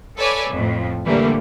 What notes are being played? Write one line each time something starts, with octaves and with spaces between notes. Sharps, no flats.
A4 B4 C#5 D5 E5 G#5
F2 A2
A#2 D3 E3 G3 A3 A#3